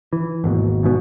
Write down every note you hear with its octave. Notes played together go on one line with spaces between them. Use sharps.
E3
G#1 D#2 B2
E2 G#2 B2